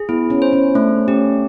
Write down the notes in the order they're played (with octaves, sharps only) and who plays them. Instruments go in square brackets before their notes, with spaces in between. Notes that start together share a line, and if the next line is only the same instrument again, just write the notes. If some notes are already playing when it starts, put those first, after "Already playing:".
Already playing: [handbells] G#4
[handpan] B3 [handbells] E4
[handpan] C#4
[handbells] C5
[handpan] C#4
[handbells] A3 [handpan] D4
[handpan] C#4 [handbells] G4